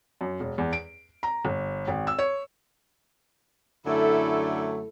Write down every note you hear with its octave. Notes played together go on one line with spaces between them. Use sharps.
F#2
E1
E2
D7
A#5
G1
G#1
E6
C#5
F#2 D3 A3 E4 A4